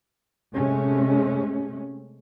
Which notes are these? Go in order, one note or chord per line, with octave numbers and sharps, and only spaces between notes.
C3 G#3 A3 C#4